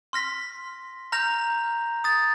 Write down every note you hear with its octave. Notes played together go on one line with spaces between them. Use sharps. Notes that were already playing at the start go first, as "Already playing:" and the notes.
C6 F6 A#6 B6
A#5 F6 G6 A#6 F7
D#6 A6